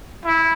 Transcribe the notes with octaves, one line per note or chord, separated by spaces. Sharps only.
E4